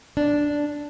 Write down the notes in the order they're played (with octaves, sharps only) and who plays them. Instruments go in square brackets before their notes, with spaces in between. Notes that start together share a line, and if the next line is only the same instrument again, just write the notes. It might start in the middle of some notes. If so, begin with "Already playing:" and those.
[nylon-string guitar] D4